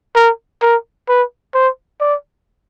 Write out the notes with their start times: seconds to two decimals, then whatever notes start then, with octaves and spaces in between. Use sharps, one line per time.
0.16 A#4
0.62 A#4
1.08 B4
1.54 C5
2.01 D5